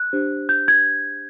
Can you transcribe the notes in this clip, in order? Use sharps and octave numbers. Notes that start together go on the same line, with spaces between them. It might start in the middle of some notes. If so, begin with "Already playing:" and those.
Already playing: F#6
D4 G4 C5
G6
G#6